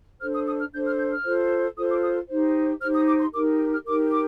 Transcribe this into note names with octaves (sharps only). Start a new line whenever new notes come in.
D4 A4 C5 F6
D#6
D#6
F6
D4 A4 C5 G6
F6
G6
F6
F4 A4 C5
F4 A4 C5 D#6
D6
D#6
D#4 G4 C5
D#4 G4 C5 F6
D#6
D6
C6
D#4 G4 A#4 D6
F6
D#4 G4 A#4 D6
D6